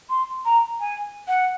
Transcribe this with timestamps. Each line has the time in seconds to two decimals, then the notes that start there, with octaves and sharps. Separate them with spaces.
0.10 C6
0.45 A#5
0.80 G#5
1.28 F#5